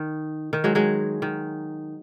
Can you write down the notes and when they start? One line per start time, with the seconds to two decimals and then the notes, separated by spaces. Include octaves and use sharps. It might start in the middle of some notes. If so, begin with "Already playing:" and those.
Already playing: D#3
0.53 D#3
0.64 F#3 G#3
0.75 F#3 G#3
1.22 D#3